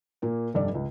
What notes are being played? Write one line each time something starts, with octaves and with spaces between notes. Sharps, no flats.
A#2 A#3
F1 G2 D5
C#2